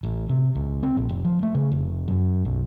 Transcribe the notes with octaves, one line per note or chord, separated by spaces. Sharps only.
A1
C3
C#2
C4
A#1
F1
F3
A3
C#3
F1
F#2
B1